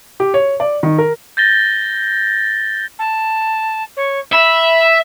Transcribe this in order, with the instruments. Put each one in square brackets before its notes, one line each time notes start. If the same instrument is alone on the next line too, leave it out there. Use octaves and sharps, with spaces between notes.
[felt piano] G4
C#5
D5
D#3
A#4
[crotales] G6 A6 A#6 G7
[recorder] A5
C#5
[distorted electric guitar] E5 [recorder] B5